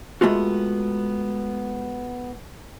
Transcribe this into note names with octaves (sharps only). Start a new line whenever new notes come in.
G#3 A3 B3 F4 F#4